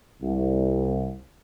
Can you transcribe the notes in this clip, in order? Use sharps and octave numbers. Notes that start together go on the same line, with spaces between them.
C2